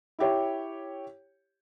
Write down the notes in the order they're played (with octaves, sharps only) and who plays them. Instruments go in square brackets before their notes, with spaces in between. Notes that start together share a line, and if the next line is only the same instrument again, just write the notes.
[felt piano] E4 G4 C#5